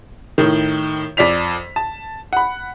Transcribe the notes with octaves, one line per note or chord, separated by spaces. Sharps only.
A2 D#3
F2 D5 B6 F7
A5
F#5 B5